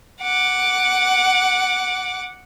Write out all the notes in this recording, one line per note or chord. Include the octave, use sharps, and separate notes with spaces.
F#5 D6